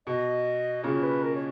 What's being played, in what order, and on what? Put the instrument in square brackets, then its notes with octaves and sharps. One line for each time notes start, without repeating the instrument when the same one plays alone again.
[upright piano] B2 [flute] D#5
[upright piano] A#2 C#3 [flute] C#5
[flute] B4
A#4
C#5